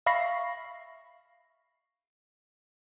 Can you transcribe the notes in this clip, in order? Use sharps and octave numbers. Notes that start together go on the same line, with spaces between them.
E5 F5 B5 C#6 A#6 C7